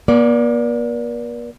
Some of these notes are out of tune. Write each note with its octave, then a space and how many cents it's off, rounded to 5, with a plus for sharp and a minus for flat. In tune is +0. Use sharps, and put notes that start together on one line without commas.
A#3 +45 D5 -10